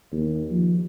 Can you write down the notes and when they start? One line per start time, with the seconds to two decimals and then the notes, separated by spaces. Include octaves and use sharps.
0.12 D#2
0.51 F3